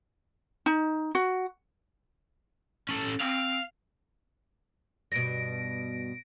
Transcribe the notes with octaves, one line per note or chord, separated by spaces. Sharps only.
D#4
F#4
C#4 A4
C4 F5
G2 B2 A#6 D7